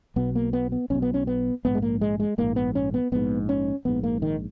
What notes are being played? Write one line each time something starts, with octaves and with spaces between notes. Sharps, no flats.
B1 B2 B3
A#3
B3
B3
B1 B2 C#4
B3
C#4
B3
A#1 G#2 B3
G#3
A#3
G#3
G#3
A#1 G#2 A#3
B3
C#4
B3
A#1 G#2 B3
C#4
A#1 G#2 B3
A#3
D#3